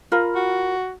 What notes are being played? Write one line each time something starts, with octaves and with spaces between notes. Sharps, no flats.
F4 A#4 B5
F#4